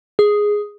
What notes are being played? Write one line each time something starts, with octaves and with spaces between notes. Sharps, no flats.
G#4